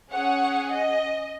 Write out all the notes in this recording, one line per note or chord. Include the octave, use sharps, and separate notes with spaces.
C#4 G#4 C#5 F#5
D#5